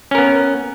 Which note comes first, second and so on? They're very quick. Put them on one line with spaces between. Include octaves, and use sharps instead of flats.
C#4 A#4 B3